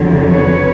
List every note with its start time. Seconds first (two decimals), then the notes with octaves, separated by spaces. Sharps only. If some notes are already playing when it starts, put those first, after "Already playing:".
Already playing: F2 D3 F#3
0.29 B4 C#5